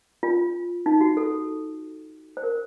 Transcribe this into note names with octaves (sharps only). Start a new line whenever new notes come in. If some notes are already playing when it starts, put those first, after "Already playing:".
F4
D#4
F#4
A4
C5
A#4